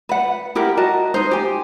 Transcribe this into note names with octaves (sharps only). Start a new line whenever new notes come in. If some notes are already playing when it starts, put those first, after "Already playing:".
B4 F#5
E4 G4 A#4 F#5
F#4 A#4 D#5 A5
D#4 C5
G4 G#5